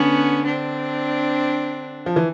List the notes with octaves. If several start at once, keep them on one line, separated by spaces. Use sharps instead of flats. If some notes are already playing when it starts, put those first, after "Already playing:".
Already playing: D3 B3 C#4
C4 D4
F3
E3